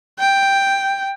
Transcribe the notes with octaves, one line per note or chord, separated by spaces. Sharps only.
G5